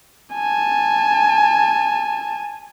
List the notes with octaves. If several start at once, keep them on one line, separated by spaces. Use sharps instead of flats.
G#5 A5